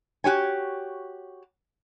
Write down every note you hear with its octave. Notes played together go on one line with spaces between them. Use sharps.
F#4 G4 C#5 G#5